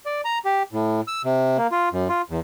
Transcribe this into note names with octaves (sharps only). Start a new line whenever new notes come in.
D5
A#5
G4
A2
E6
C3
A#3
F4
F#2
F4
E2